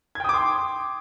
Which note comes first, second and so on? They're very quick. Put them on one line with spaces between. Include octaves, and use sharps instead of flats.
G#6 G5 D#6 D6 C6